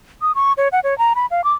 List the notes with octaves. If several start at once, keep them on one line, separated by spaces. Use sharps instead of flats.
D#6
C#6
C#5
F#5
C#5
A#5
B5
F5
D6